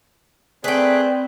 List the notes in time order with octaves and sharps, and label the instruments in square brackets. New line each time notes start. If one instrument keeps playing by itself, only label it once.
[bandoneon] A3 G#4 F#6 [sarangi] C4 [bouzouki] B4 G5 [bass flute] D5